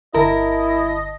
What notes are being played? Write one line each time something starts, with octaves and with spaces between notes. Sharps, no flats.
G1 D3 E4 A#4 D#5 A5